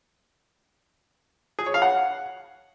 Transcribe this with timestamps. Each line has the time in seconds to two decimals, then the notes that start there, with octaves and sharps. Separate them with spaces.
1.59 G#4
1.66 C#5
1.74 F5
1.82 F#5